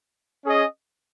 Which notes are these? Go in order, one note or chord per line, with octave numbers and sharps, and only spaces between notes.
C#4 G#4 D#5